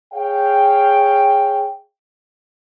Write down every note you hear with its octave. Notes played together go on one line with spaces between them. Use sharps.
G#4 C#5 F5 G5